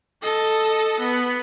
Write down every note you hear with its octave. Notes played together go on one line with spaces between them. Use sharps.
A4 D#5
B3